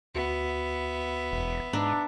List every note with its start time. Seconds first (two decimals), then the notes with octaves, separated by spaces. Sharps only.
0.15 D2 B3 F#4 E5
1.32 E1
1.73 G#2 D4 A#5 E6